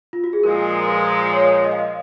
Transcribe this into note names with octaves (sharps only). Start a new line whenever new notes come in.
F4
F#4
G#4
A#2 F3 G#3 A#4
B4
C#5
D#5
F5
D#5